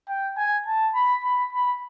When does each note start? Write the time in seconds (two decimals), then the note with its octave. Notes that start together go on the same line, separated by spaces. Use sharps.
0.09 G5
0.37 G#5
0.67 A5
0.95 B5
1.24 B5
1.53 B5